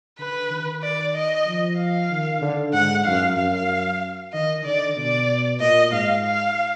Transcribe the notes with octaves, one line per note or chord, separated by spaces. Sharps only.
D3 B4
D#3
D5
D#5
F3
F5
D#3
D3
G#2 F#5
F#2 F5
F#2 F5
D#3 D#5
D3 D5
B2 D5
A#2 D#5
G#2 F5
F5